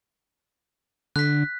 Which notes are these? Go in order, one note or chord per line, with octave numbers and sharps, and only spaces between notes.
D3 F#6 B6